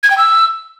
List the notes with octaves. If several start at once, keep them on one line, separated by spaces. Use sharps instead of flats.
G#6
G5
E6